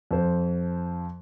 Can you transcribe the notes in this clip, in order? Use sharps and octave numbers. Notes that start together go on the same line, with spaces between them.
F2 C5